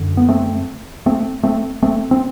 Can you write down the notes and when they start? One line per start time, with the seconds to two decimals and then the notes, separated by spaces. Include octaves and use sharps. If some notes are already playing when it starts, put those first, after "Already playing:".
Already playing: F#2 D3
0.17 B3
0.29 A3 C4
1.06 A3 C4
1.43 A3 C4
1.82 A3 C4
2.11 C4